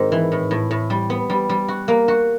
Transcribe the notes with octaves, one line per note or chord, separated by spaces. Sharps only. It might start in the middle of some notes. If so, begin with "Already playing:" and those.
Already playing: G#2 D#3 C4
E3
A2
A2
A2
G3
B3
G3
G3
F#4
A#3
F#4